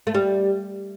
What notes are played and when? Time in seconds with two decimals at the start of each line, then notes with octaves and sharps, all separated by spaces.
0.07 A3
0.15 G3